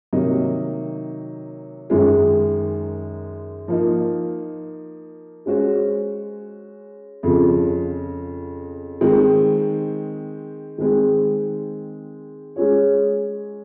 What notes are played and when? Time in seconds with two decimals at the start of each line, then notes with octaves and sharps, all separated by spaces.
0.13 C3 D#3 F#3 A#3 D#4
1.90 F#2 D#3 G#3
3.68 F3 A#3 D#4
5.46 G#3 C#4 F#4 C5
7.23 F2 C#3 F3
9.01 D#3 G#3 C4
10.78 D#3 G#3 C4
12.56 G#3 C#4 G#4 C#5